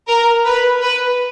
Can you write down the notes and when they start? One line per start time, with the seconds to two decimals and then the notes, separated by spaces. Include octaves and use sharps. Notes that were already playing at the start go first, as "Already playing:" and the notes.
0.08 A#4
0.45 B4
0.82 B4